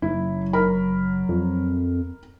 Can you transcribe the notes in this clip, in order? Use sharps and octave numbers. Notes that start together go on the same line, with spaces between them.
F#1 F#3 E4
A#4 B5
F2